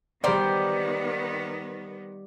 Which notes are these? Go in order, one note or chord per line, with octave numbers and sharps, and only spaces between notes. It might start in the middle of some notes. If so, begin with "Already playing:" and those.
D#3 G3 B3 A#4 C5 D5 G5